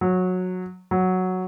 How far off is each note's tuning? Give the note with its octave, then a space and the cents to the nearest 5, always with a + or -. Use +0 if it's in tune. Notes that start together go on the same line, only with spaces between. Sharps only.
F#3 -15
F#3 +0